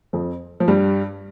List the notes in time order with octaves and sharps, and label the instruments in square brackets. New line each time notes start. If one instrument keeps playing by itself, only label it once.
[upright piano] F2 F3
F3
G2 G3